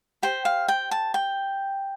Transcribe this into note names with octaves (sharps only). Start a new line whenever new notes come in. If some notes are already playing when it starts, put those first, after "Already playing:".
G4 C5 G5
F5
G5
A5
G5